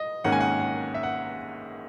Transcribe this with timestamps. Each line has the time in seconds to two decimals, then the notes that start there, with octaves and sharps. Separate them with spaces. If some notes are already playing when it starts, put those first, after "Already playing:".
Already playing: D#5
0.24 G#1 G#2 D#3 A#3 C#4 F#5
0.32 G#5
0.40 F#5
0.60 F#5
0.94 E5
1.03 F#5